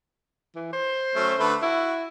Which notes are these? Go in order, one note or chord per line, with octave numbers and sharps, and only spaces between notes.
E3
C5
F#3 A3 C#4
D3 A3 B4
E4 F#4